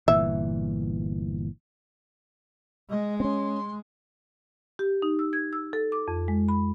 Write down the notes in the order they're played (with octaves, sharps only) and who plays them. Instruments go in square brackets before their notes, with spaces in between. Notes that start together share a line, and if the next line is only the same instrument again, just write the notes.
[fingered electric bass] G1 A#2 E3 [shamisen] E5
[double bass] G#3 [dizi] D#5
[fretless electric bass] C4 C#4 [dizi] C6
[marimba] G4
D#4
E6
G#6
E6
A4
D6
F2
G#3
B5